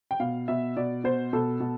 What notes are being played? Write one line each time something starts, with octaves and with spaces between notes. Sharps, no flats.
G5
B2 F5
B2 E5
B2 D5
B2 C5
B2 A4
B2